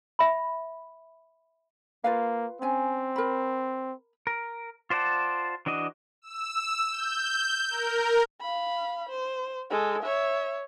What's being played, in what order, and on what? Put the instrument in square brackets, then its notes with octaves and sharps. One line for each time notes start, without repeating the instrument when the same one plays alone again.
[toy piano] E5 B5
[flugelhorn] A#3 [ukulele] F4 B4 F5
[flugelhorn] C4 [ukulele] C#4 G#5
[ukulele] A#4 B5
[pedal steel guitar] A#4
F4 C5 D5 F#5 A5
E3 D4 F#4 D#5
[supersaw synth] E6
G6
A#4
[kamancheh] F5 B5
C5
G#3 A4
C#5 E5